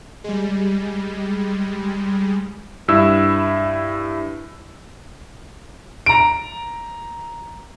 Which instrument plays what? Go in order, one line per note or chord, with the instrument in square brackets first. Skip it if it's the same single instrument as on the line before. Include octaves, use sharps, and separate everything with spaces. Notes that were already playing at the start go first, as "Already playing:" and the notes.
[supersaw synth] G3 G#3
[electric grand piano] G2 E4 E6
[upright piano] A#5 D7